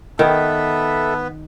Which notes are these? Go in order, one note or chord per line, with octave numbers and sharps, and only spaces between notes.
D#3 B3 A4 B4 E5